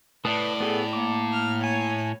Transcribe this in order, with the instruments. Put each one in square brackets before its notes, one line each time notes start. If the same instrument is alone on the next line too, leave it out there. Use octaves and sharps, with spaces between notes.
[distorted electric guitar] A2 [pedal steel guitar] B4 A5 D#6 [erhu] D5
[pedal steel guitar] B3 G#4 A4
[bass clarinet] A#3 [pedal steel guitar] D6
[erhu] F6
[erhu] C#5 [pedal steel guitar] G#5